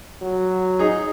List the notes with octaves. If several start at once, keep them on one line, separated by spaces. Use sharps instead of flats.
F#3
D#4 G#4